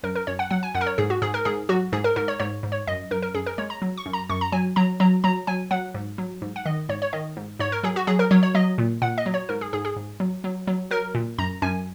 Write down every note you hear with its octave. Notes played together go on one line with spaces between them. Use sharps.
F#2 A#4
A#4
F#2 C#5
F#5
F#3 F#5
G#5
F#2 F#5
A#4
C#5
G#2 G#4
F#4
G#2 G#4
A#4
G#2 G#4
F#3 F#4
G#2 G#4
A#4
G#2 A#4
C#5
G#2 C#5
G#2
C#5
F#2 D#5
F#2 A#4
A#4
F#2 G#4
A#4
G#3 C#5
A#5
F#3
C#6
F#2
A#5
F#2 C#6
A#5
F#3 G#5
F#3 A#5
F#3 A#5
F#3 A#5
F#3 G#5
F#3 F#5
G#2
F#3
G#2
F#5
D#3 D#5
G#2 C#5
C#5
D#3 D#5
G#2
G#2 C#5
A#4
F#3 G#4
F#4
F#3 G#4
A#4
F#3 C#5
C#5
F#3 D#5
A#2
A#2 F#5
D#5
F#3
C#5
G#2 A#4
G#4
G#2 G#4
G#4
G#2
F#3
F#3
F#3
F#3 A#4
A#2
F#2 A#5
F#2 G#5